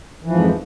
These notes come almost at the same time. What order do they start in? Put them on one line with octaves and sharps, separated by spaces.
E3 F3 G#2 F2